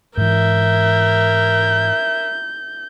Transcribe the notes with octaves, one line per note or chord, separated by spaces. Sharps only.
G#2 E3 A#4 E5 G6